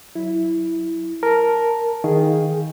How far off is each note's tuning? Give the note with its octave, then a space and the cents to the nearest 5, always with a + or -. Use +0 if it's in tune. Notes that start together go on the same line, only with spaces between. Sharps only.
F#3 +0 E4 +0
A#4 +0 A5 -5
D#3 +15 G#4 +0 F5 +15